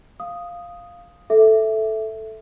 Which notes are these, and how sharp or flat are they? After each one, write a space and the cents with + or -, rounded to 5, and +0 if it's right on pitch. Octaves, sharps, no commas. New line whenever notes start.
F5 +0 D#6 +0
A4 -5 E5 +0